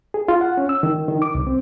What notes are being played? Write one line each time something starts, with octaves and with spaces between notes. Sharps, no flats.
G#4
F4
F#5
C#4
E6
D#3
D#3
D6
C2
C4